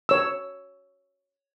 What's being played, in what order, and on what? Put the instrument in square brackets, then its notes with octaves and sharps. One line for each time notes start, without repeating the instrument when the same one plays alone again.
[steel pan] C#5 E6